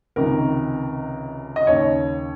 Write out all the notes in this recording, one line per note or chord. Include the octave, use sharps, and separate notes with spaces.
C#2 C3 D#3 A#4
D#5
D#2 C#3 C#5